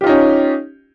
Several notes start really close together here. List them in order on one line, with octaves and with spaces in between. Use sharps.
G4 F4 D#4 C#4